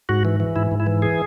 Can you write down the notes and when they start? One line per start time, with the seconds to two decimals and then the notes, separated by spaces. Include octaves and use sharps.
0.09 G#2 F#4
0.25 E3
0.40 E3
0.56 G#2 E4
0.71 G#2
0.80 E4
0.87 E3
1.02 G#4